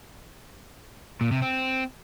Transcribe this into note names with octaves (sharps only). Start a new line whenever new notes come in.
A#2
C3
C4